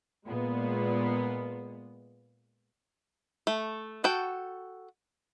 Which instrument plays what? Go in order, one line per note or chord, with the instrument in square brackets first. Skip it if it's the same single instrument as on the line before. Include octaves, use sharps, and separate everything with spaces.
[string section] A#2 G#3 B3
[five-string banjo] A3
F#4 A4 G5